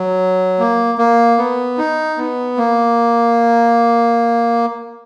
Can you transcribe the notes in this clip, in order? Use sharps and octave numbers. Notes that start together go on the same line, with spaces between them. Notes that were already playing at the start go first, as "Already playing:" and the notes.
Already playing: F#3
A#3
A#3
B3
D#4
B3
A#3